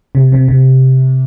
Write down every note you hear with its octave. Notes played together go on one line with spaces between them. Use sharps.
C3
C3
C3